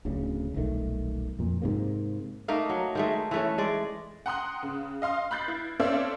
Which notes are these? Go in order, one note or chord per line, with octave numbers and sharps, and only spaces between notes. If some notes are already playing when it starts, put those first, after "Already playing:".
D1 D2 C#3
D#1 B1 D#3 A3
F2 A#2
G#2 C3 A#3
A3 A#3 D#4 A#4
F#3
D#3 G#3 A3
E3 A3 C#4
G#3 D5
F#5 G5 A#5 C6 D#6 F#6
C#3
D#5 F5 C6 F6
B5 F#6 G6 A6 C7
E4
C4 C#4 A4 D5 E5 F5